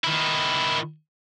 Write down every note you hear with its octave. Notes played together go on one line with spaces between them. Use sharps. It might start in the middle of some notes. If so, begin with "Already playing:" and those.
D#3 E4